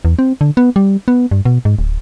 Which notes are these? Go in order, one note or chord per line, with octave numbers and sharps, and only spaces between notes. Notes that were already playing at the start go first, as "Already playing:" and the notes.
E2
C4
D3
B3
G3
B3
G2
B2
G#2
D1